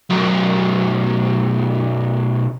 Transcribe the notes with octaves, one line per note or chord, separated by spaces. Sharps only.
B1 F#2